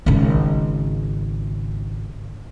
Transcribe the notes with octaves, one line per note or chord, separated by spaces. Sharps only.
G#1 C#3